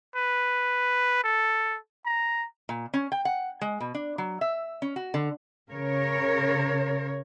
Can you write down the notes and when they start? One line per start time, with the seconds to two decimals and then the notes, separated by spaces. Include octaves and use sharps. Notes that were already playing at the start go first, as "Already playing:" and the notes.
0.16 B4
1.24 A4
2.05 A#5
2.69 A#2
2.94 C#4
3.12 G5
3.25 F#5
3.61 G#3
3.80 B2
3.95 D4
4.18 F#3
4.41 E5
4.82 C#4
4.96 F#4
5.14 D3
5.71 C#3 A#4 C#5